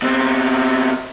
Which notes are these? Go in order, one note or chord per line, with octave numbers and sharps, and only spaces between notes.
B2 C4